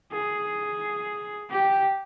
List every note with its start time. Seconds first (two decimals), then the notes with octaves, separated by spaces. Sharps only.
0.12 G#4
1.50 G4